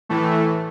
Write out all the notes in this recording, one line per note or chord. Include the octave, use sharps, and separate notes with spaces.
A2 E3 A3